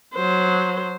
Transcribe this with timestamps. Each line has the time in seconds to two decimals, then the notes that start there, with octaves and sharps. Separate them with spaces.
0.14 F#3 C5